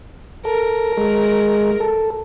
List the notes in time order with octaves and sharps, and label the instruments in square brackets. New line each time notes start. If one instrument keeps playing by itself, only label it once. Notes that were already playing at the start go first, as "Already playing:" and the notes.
[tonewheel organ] A4 [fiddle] A#4
[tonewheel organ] G#3
A4